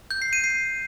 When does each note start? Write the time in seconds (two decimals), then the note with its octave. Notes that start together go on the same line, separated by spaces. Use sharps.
0.11 G6
0.22 C7
0.33 D#7
0.44 C7